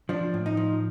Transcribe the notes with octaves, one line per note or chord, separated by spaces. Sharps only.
F3 D4
A2
D#4
F3